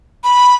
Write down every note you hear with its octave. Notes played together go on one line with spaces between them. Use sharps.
B5